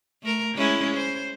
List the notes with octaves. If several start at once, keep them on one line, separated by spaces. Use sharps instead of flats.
A3 A#4
G#3 C#4 E4
C5